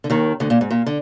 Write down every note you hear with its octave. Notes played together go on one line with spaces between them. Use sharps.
D3
D#2 D#3
D2 D3
A#2
G#2
A#2
D3